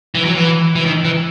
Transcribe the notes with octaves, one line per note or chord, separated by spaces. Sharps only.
E3
F#3
E3
E3
D#3
E3